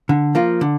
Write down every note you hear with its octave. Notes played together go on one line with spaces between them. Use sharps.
D3
F3 A#3 F4
D3